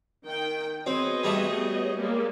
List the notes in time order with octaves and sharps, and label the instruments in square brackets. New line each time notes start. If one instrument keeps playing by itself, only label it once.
[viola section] D#3 G5
[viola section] B3 G#4 D#5 [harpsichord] C4 [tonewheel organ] F#4 C#5
[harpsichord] G3 A3
[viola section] G3 G#3 A#3